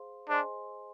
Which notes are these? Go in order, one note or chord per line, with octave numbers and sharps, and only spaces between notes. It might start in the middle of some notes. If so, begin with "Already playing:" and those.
Already playing: G#4 C5 F5 C6
D4 G#4 C5 D#5 G#5 C6